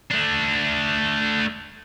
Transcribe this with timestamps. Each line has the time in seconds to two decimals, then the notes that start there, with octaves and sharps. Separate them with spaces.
0.11 A3 D4